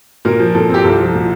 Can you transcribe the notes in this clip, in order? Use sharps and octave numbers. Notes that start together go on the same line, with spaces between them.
A#2 A#4
F3
A#2 A4
C4 G4
C2 A4
F3
A#2